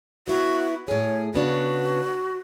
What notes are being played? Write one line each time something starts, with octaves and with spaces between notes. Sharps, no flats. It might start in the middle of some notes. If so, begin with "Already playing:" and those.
B3 E4 F#4
A2 G#4 C#5
C#3 B3 D4 F#4